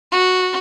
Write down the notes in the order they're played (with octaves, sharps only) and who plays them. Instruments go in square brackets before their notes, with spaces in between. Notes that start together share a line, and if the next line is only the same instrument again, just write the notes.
[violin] F#4